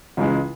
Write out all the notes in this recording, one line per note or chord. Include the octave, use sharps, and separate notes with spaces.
C#2 C#3 E3 G#3